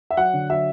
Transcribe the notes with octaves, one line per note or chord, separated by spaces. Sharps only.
E5
F#3 F#5
D3
F#3 E5